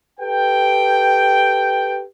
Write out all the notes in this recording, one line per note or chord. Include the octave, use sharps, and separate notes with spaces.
G4 A4 B4 G5